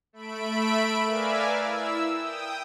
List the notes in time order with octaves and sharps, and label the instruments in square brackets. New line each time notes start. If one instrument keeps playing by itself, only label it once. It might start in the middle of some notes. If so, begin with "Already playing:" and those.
[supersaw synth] A3 E5 B5 D7
A#4 B4 D5 E5 F5 G#5
E4 E6
G5 D#6